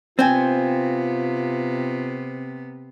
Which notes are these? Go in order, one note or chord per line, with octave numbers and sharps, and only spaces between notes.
C3 B3 C4 F4 G5 G#5